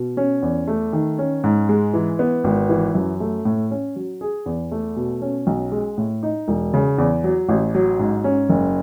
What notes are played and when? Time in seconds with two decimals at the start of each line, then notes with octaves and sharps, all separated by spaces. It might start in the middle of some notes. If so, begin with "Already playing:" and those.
Already playing: B2
0.17 C#4
0.42 E2
0.68 A3
0.93 D#3
1.19 C#4
1.44 G#2
1.69 G#3
1.94 E3
2.19 B3
2.44 G#1
2.69 E3
2.95 F#2
3.20 A3
3.45 A2
3.71 C#4
3.96 F#3
4.21 G#4
4.46 E2
4.72 A3
4.96 B2
5.22 C#4
5.47 B1
5.72 G#3
5.98 A2
6.23 D#4
6.48 E1
6.74 C#3
6.98 E2
7.24 F#3
7.49 A1
7.75 F#3
7.99 G#2
8.24 C#4
8.49 F#1